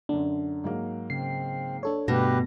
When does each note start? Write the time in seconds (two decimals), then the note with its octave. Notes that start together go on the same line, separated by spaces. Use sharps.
0.09 F#2 D3 D4
0.64 G#2 F#3 A#3
1.10 C#3 C4 C7
1.83 D4 A4 C#5
2.08 G2 B2 D3 A3 G4 B4 A#6